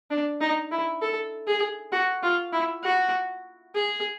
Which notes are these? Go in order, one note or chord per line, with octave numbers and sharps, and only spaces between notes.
D4
D#4
E4
A4
G#4
F#4
F4
E4
F#4
G#4